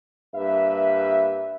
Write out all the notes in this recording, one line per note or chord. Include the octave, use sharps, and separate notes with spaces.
G2 A#3 B4 E5